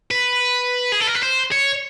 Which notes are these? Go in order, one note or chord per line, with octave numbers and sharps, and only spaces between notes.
B4
G#4
A4
A#4
B4
C5
C#5